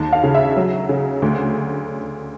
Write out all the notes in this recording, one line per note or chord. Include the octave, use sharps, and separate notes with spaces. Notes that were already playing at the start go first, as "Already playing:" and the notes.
Already playing: D#2 A5
F5
C#3
E5
F#3
C#3
D2